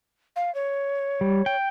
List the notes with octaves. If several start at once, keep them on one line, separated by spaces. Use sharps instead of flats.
F5
C#5
G3
G5